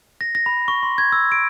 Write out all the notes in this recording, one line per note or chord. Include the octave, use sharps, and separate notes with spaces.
A#6
A#6
B5
C#6
C6
G#6
E6
D7